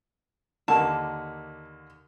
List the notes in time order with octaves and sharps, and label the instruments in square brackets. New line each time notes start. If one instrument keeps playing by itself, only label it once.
[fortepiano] D#2 D3 A#3 [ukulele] A5